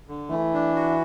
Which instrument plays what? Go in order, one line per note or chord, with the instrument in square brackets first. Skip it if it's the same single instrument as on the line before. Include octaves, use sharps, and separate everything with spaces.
[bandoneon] D3
[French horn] E3 [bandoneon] A3
[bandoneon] D4
F#4